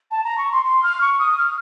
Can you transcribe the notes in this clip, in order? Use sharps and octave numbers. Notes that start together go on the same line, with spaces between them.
A5
A#5
C#6
C6
C6
F6
C#6
D#6
F6